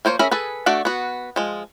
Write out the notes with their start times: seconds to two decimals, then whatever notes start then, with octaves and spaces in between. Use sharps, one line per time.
0.05 F3 A#3 C5 C#5
0.19 C#4 G#4 A#4 E5 B5
0.31 G#4 A4 B4
0.66 A3 D4 F#4 D5 F#5
0.85 B3 F#4
1.36 F3 G#3